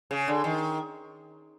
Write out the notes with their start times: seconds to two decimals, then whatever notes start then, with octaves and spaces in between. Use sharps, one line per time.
0.11 C#3
0.28 D3
0.44 D#3